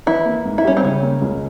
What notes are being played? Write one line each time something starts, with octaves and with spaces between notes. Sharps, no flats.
E3 E4
A#3
G#2
E4
G3 C#4
C4
C#3 C#4
A#3
C#2